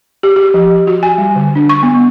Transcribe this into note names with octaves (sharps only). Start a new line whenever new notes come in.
G4
G4
F3
F#4
G#5
G3
D3
D4
C#6
B3